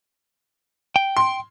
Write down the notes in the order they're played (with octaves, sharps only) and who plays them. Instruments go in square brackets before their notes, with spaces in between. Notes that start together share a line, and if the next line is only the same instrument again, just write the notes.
[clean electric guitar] G5
[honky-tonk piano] C6